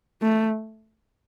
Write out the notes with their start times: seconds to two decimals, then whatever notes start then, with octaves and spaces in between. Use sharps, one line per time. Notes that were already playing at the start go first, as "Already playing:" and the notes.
0.22 A3